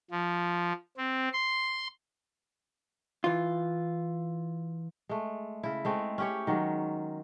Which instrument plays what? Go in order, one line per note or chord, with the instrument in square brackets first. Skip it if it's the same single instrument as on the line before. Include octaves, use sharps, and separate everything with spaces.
[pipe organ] F3
C4
C6
[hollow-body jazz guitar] E3 F4
[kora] G#3 A3
C#3 E4
G#3 A3 C4
C#4 G4 C#5
D#3 F#3 G#3